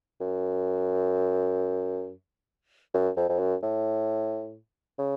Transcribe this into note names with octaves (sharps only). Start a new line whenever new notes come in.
F#2
F#2
F2
F2
F#2
A2
C#3